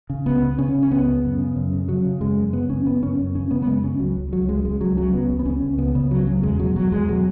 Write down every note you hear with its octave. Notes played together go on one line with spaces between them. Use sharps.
C#3
C#2 B3
C#3
C#3 C#4
C#3
C#4
C#2 B3
C#3
F#2
C#3
F#2
C#3
C#3 F#3
C#3
F#2 G#3
F#2
C#3 B3
F#2 C#4
C#3 B3
F#2 C#4
F#2
C#3 C#4
C#3 B3
B3
F#2 G#3
C#3 C#4
C#2 F#3
C#2
C#2 F#3
C#3 G#3
C#2 G#3
C#2 F#3
C#3 F#3
C#2 B3
C#2
B3
C#2 C#4
C#2
C#3 B3
C#3 B3
C#2 F#3
C#3 F#3
E2 G#3
B2 F#3
E2 F#3
E2 G#3
B2 F#3